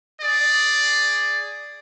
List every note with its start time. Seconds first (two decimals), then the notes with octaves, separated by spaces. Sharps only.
0.21 G#4 D5